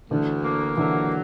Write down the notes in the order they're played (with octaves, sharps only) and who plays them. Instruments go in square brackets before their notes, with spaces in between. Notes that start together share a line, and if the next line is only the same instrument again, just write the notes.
[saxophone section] D2 [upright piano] D3 E3
[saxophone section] A#3
[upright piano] D3 E3 [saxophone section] F#3